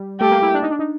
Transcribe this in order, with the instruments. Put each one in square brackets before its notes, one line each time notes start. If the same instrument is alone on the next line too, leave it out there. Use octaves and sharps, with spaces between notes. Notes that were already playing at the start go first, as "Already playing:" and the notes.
Already playing: [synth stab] G3
[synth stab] A3 [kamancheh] G4
[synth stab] A#3
E4
D4
D#4
D4
D#4